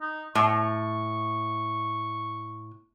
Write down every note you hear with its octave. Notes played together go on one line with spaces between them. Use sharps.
D#4
A2 C#6